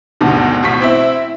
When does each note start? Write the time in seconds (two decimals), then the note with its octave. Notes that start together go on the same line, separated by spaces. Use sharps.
0.21 G#1 D2 G2 B2 D#3
0.63 A1 B2 C#6 B6
0.80 C4 E4 E5